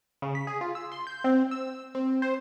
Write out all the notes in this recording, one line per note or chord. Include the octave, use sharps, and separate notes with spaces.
C#3
B6
G#4
F4
E6
C6
G6
C4
E6
C4
C5